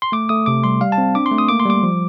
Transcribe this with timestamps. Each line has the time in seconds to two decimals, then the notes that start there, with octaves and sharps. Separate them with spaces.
0.02 C6
0.12 A3 D6
0.29 A3 D#6
0.46 C3 D6
0.64 G3 C6
0.81 G3 F5
0.92 A5
0.98 C4
1.15 D4 D6
1.26 C6
1.32 A3
1.38 D#6
1.49 A#3 D6
1.60 C6
1.66 G3 D6
1.83 F3